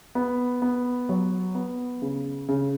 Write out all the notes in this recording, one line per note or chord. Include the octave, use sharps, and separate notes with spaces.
B3
B3
F#3
B3
C#3
C#3